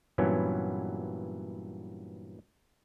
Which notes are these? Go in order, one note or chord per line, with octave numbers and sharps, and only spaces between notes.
G2 A#2 E3 F#3 B3 C#4